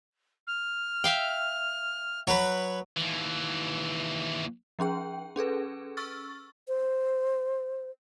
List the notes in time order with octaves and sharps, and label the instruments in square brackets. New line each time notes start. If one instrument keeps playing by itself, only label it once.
[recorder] F6
[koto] E5 F5 G5
[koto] F#3 [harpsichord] B4 C#5
[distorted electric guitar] D#2 E3
[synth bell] F3 C#4 G#4 G5
C#4 G#4 A4 B4
C#6 E6 F6 A6
[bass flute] C5